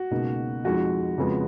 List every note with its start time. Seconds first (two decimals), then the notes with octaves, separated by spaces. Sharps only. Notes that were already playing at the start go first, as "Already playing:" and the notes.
Already playing: F#4
0.11 C#2 B2 A#3 D#4
0.64 F2 F3 G#3 D#4 F#4
1.18 F2 C#3 F3 G#3 B3